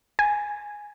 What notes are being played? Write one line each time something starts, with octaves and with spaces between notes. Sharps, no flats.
G#5